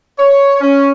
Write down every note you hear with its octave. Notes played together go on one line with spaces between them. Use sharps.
C#5
C#4